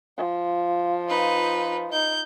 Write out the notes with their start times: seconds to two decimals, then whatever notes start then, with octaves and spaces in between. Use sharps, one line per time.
0.17 F3
1.08 D#4 B4
1.93 D#4 G6